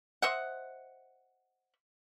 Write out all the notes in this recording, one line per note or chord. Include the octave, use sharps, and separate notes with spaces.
C5 D#5 E5 F#5